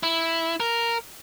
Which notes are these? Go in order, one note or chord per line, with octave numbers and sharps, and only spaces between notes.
E4
A#4